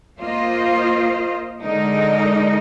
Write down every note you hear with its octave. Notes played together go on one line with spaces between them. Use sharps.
A#3 F4 C5 D#5
D3 G#3 D#4 A#4 D#5